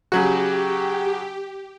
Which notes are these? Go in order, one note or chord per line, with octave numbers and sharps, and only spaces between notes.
C#3 F#3 F#4 G4